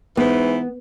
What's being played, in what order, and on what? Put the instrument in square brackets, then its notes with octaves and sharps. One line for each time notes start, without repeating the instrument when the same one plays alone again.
[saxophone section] G#2 E3 [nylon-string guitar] B3